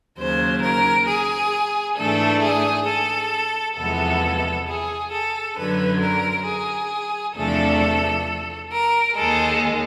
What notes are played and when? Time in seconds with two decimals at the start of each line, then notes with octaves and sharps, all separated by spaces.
0.19 D#2 C#3 F#3 C5
0.63 A#4
1.08 G#4
1.98 G#2 E3 A3 D4 A4
2.43 G#4
2.88 A4
3.77 E2 C3 F3 G#3 B3 A4
4.68 G#4
5.12 A4
5.57 F#2 D3 F#3 B4
6.02 A#4
6.47 G#4
7.37 E2 C3 F3 A3 D4 A4
8.71 A#4
9.16 D#2 D#3 G#3 A4